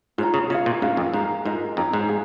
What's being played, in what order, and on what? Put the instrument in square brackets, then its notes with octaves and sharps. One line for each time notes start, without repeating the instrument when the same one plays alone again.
[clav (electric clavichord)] G#2 [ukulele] F4 C#5 A#5
[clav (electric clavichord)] C#3
[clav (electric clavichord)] C#3 [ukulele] F4 C#5 F5
[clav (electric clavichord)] A#2
[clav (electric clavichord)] G#2 [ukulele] C#4 F4 A#4 F5
[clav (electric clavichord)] F2
[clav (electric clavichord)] G#2 [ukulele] A#4 F5 A#5
[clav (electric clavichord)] G#2 [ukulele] F4 A#4 D#5
[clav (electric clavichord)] F2 [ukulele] D#4 C#5 A#5
[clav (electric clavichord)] G#2
[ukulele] G#4 F5